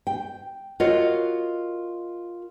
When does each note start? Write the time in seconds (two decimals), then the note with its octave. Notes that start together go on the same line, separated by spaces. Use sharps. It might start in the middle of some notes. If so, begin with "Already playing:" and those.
0.07 G5
0.80 F4 F#4 A#4 C#5 D#5 F#5